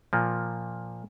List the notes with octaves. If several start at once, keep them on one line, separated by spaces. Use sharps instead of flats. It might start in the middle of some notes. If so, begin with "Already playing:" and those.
A#2 F3 A#3